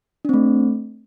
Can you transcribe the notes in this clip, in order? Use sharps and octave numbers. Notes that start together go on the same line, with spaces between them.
A3 C4 D4